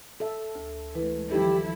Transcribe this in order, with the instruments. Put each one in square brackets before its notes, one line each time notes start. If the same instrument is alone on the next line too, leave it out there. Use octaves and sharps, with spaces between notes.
[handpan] A4 E5
[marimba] D2
[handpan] E3 [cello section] G#3 A3 [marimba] E4 B4
[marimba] D#3 [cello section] F3 G3 E4 [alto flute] G4 [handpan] A4